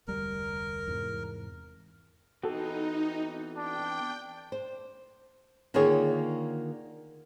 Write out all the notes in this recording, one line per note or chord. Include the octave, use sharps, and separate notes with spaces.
F1 D2 G3 A#4
E2 G#2 C3
E3 B3 C4 D#4 F#4 A4
D4 G5
C5
D3 D#3 A#3 F4 G#4 C#5